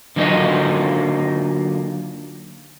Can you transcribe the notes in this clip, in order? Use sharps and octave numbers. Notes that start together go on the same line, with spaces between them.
D3 F#3 A#3 D#4 F4 D#5